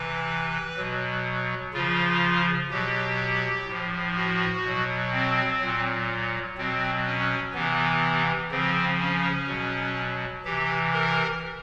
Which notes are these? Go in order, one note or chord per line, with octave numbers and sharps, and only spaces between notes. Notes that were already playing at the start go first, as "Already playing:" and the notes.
Already playing: C3 E3 B4
B2 F#3
C#3 F3 F4
B2 F#3 G4
A2 F3
F#4
B2 F#3
C4
A#2 F#3
B2 F#3 C4
C#4
C3 E3 B3
C#3 F3 C4
C#4
B2 F#3
C3 E3 G4
A#4